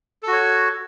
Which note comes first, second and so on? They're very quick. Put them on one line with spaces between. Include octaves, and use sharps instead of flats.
A4 F#4 C#5